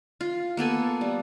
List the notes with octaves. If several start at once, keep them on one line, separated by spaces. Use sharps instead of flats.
F4
A#3 B3 A4 G#5
G3